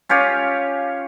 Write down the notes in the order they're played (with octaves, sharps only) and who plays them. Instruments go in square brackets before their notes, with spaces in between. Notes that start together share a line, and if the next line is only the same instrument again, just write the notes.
[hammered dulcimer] C#4 F4 G4 C#5